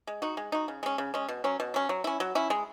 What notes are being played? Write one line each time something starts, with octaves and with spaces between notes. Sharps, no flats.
G#3
D#4 F#4
G#3
D#4 F#4
C#3
G#3 C#4
C#3
G#3 C#4
B2
F#3 C#4
B2
F#3 C#4
F#3
C#4 E4
F#3
C#4 E4
G#3